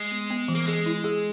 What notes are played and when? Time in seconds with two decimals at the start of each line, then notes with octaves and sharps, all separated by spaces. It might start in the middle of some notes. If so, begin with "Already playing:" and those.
Already playing: G#3
0.12 B3
0.30 B3
0.48 E3
0.55 A#3
0.67 G#3 G#4
0.86 E4
1.04 G#4